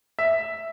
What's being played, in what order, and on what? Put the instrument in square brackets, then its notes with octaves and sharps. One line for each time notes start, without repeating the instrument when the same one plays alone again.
[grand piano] E5